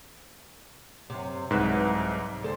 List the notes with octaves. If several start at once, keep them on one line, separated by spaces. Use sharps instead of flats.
F#2 C3
C2 G#2 F#3 B4 E5
D2 A4 C5